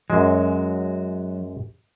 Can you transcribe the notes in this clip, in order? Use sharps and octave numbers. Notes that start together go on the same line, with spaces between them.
F#2 F#3 G#3